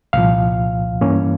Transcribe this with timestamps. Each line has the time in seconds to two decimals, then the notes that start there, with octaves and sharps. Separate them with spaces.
0.13 C2 A#2 F3 F5
1.01 G2 E3 A#3 C#4